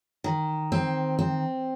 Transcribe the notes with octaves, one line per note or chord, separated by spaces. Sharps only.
D#3
C4
C4